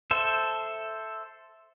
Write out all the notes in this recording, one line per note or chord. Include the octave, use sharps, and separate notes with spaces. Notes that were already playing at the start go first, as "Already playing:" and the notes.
A4 C5 E5